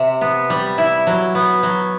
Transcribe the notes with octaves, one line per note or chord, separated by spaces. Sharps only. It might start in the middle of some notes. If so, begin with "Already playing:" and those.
Already playing: C3
B3
G3
E4
F#3
B3
F#3